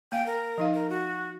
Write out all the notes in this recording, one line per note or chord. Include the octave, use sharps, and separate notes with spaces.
A#3 F5 G5
A#4
F3 D#4 F5
A#4
F#4